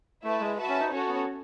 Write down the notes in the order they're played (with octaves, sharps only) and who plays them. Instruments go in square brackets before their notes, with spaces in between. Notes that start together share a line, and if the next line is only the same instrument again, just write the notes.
[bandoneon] A3 [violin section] E4 B4 E5 A5
[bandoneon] G#3
[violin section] F#4 B4 E5 A5
[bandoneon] C#4
D#4
[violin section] C#4 F#4 A4 C#5
[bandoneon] B3